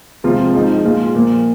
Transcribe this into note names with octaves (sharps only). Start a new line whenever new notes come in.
C3 F3 G#3 F4
F3 G#3 D#4
A#2 G#3 F4
A#2 F3 A#3